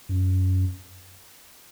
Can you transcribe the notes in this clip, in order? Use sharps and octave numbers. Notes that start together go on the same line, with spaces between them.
F#2